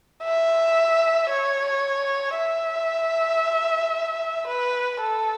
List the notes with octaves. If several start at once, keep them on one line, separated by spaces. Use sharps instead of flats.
E5
C#5
E5
B4
A4